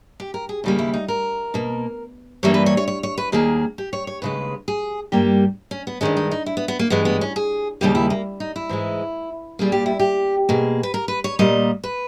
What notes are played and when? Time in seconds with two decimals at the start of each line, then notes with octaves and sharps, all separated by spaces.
0.20 G4
0.34 A#4
0.49 G#4
0.64 D#2 C#3 G3 A#3
0.79 E4
0.94 D#4
1.08 A#4
1.54 B2 A#3
2.43 G2 E3 G3 A#3 C#5
2.54 B4
2.66 C#5
2.77 C#5
2.88 C#5
3.03 C#5
3.18 B4
3.32 D#2 D#3 A#3 G#4
3.78 G4
3.93 C#5
4.07 C#5
4.22 D#2 C#3 G#3 B4
4.68 G#4
5.12 G2 G3 A#3 G4
5.71 C#4
5.87 B3
6.01 G2 D#3 G#3 C#4
6.17 D#4
6.31 D#4
6.46 E4
6.57 B3
6.68 B3
6.79 A#3
6.90 G2 E3 G#3 B3
7.05 B3
7.21 C#4
7.36 G#4
7.81 D#2 C#3 G3 A#3 G4
7.95 E4
8.10 A#3
8.40 D#4
8.56 E4
8.69 G#2 E3 G#3
9.59 A#2 G3 A#3 G#4
9.72 G4
9.86 E4
9.99 G4
10.49 B2 A#3 G#4
10.83 B4
10.94 A#4
11.08 B4
11.24 C#5
11.39 A#2 G3 A#3 D#5
11.83 B4